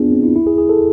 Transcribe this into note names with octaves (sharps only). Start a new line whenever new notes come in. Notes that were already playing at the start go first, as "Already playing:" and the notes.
Already playing: B3 D4 F4 G#4
C4
E4
E4
G#4
G#4
A4